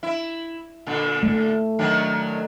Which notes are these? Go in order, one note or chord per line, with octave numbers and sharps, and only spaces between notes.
E4
A#2 D3
A3
D#3 F#3 D4